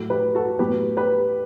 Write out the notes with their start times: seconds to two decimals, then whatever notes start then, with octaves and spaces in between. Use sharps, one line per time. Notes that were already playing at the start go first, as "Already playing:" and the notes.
Already playing: A2 F#3 A3
0.10 G4 B4
0.35 F#4 A4
0.59 A2 F#3 B3 G4 B4
0.97 G4 B4